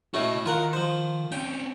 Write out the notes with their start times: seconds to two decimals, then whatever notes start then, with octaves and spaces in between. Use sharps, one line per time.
0.14 A2 A3 C#4 F#4 D#5
0.46 D#3 F4 A#4 F#5
0.73 F3 C5
1.32 C4 C#4 G5